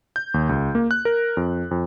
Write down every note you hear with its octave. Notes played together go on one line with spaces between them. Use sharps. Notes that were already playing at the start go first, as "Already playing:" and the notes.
G6
D#2
C#2
A#3
F#6
A#4
F2
F2